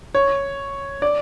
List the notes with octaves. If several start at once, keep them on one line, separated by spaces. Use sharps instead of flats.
C#5
D5